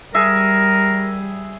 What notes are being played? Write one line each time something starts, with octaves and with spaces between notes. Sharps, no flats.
G3 G#4 A#4 E5